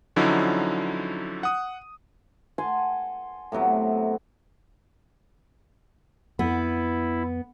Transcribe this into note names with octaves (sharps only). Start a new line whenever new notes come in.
D3 F3 F#3 C#4 D#4 E4
F#5 D#6
F#5 G#5 A5 C6
A2 C3 F#3 B3
F2 B3 E4